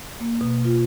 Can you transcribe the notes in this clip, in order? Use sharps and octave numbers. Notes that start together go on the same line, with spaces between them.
A#3
B2
F4